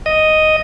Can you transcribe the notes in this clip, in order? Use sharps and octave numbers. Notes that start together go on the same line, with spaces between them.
D#5